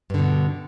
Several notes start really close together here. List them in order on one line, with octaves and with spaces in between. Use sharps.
G2 D3 B2